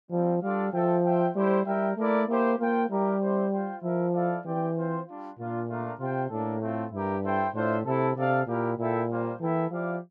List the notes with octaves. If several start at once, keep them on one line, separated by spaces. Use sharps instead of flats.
F3 G3 C4 F4
G3 D4 F4 A4 D5 F5
F3 F4 A4 E5 G5
F4 C5 E5 G5
G3 A3 E4 G4 C5
G3 E4 A#4 E5 G5
A3 A#3 E4 A#4 D5
A#3 E4 G4 C5
A#3 F4 C5 G5
G3 E4 G4 A#4
C4 E4 G4 C5
F4 C5 G5
F3 E4 A#4 E5
E4 A4 D5 F5
E3 C4 G4 D5 G5
C4 F4 C5
G3 D4 F4
A#2 A#3 D4 F4
A3 D4 F4 A#4
C3 F4 C5 G5
A2 A#3 D4 A4
A3 C4 F4
G2 E4 G4 A#4
E4 A4 C5 G5
A2 D4 F4 C5 E5
C3 A3 E4 A4
C3 D4 A4 D5 F5
A#2 A#3 E4 G4 A#4 F5
A#2 A#3 E4 A4 E5 G5
G3 A#3 F4 C5 F5
E3 A#3 E4 A4 E5 G5
F3 E4 G4 D5 F5